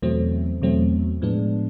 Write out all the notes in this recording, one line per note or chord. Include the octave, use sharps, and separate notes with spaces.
E2 B2 F#3 A3 C4
E2 B2 F#3 A3 C4
A2 F3 G#3 B3 D4